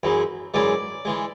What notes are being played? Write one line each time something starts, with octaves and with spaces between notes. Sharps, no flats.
F#2 E3 G#3
F#2 E3 G#3 D5
E3 G#3